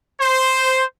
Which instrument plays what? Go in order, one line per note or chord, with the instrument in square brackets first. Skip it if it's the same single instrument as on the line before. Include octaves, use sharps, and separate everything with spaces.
[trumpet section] C5